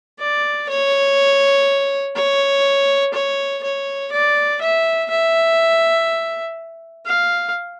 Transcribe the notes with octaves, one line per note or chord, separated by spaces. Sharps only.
D5
C#5
C#5
C#5
C#5
D5
E5
E5
F5